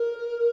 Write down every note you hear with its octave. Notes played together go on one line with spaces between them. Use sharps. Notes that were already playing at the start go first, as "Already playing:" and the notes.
Already playing: A#4